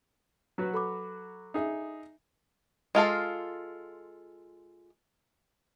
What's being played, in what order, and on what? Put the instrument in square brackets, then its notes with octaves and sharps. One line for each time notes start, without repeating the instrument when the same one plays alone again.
[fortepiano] F#3 F#4 B4
[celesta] A4 B5 D6
[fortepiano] D#4 G#4 E5
[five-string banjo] G#3 F4 A4 F5